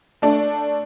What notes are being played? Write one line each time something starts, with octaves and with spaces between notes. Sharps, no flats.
A3 D4